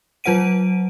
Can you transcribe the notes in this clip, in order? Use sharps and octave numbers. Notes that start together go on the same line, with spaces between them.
F#3 F4 C5 F#5 D7 D#7